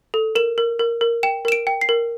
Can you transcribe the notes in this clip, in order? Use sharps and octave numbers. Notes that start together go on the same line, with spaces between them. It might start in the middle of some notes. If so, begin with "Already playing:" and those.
A4
A#4 E7
A#4
A#4
A#4
G5 E7
A#4 E7
D7
G5
C7
A#4